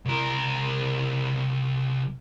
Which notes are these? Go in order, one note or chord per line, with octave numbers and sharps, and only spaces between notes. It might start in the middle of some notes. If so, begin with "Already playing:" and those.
C2 A#4